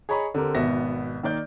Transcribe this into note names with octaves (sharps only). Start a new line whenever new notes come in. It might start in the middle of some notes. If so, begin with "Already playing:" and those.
G#4 C#5 D#5 A#5 B5 C#6
D3 C4 G4 A#4
G#1 B2 B3 E5 A#6
D#3 A#3 D5 G6